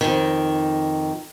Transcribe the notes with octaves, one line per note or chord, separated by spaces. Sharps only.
F2 D#3